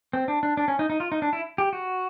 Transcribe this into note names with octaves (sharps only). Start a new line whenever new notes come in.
C4
D4
D4
D4
C#4
D#4
D#4
F4
D#4
D4
E4
G4
F#4